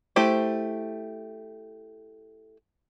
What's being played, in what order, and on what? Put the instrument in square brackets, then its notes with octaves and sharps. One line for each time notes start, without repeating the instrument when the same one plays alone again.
[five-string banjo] A3 E4 G4 C5